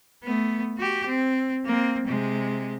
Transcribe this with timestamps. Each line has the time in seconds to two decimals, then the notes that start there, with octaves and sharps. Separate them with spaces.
0.23 A3 B3
0.77 F#4 G4
1.06 C4
1.65 A#3 C4
2.07 C3 G#3